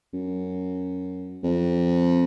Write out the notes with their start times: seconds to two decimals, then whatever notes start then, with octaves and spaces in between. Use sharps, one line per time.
0.13 F#2
1.43 F2